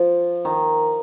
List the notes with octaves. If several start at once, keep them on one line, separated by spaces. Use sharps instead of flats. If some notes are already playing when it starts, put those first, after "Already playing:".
Already playing: F3
D#3